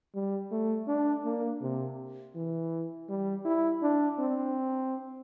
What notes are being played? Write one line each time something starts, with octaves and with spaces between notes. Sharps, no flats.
G3
A3
D4
A#3
C3
E3
G3
E4
D4
C4